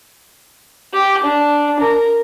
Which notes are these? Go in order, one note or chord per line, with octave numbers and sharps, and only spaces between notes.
G4
D4
A#4